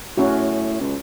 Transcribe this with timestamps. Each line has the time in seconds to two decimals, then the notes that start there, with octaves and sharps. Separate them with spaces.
0.17 A2 C#4 F#4
0.81 C#2